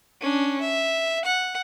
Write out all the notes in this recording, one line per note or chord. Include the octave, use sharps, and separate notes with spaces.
C#4 D4
E5
F#5